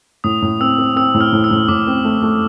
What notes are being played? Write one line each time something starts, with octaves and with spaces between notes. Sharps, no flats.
A2 D#6
A2
C4 E6
C4
C4 E6
A2
F6
A2
E6
A2
A2 D6
C4
A3
A3